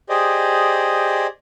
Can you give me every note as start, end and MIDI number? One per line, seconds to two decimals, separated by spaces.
0.09 1.27 67
0.09 1.27 68
0.09 1.27 72
0.09 1.27 74
0.09 1.27 75